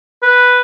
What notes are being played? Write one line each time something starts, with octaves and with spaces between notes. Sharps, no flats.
B4